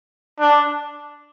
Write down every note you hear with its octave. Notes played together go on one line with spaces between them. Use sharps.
D4